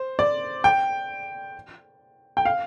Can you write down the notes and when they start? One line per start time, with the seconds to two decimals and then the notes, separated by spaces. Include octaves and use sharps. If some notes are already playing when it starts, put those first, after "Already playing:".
Already playing: C5
0.19 D5
0.64 G5
2.37 G5
2.45 F5